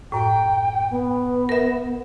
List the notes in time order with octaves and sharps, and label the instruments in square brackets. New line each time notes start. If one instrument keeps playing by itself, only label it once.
[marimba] F#2 A2 [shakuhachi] G5
[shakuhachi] B3
[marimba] A#4 E5